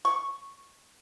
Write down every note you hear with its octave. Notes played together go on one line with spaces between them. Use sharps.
C#6